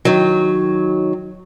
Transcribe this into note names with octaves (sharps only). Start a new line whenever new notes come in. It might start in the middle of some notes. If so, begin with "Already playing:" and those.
D#3 F#3